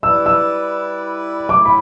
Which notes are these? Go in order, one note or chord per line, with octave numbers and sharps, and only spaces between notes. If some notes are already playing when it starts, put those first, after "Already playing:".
G3 E4 B4 D5 E6
E6
A2 A3 E4 D6
B5